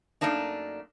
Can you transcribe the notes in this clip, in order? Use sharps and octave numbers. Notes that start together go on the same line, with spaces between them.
F#2 D#3 A3 A#3 D4 D#4